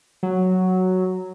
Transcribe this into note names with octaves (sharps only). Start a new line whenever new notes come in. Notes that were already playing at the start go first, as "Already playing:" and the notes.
F#3